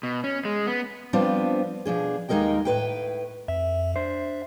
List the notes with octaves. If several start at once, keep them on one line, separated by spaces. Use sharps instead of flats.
B2
C#4
G#3
B3
F3 G3 B3 C4 D4 F4
B2 F3 D4 G#4
D#2 G#3 D#4 A#4 D#5 G5
A2 B4 G5
F2 E5
D4 C5 E5